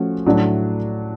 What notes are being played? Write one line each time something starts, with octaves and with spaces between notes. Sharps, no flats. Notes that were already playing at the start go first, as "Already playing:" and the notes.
Already playing: F3 A3 C#4 F#4
A2 F#3 A3 D4 F#4